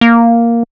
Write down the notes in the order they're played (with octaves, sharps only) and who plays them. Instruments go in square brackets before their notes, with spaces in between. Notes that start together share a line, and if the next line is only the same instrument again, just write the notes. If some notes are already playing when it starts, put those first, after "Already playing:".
[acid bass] A#3